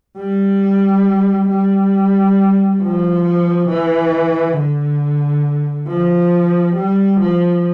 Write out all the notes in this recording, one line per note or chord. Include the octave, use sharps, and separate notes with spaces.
G3
G3
F3
E3
D3
F3
G3
F3